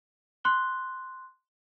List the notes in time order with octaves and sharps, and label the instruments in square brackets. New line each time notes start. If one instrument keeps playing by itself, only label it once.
[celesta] C6 F#6 G7